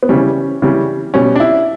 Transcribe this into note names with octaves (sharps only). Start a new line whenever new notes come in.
B3
C#3 E3 G3 C#4
C#3 E3 G3
B2 G3 C#4
D4
E4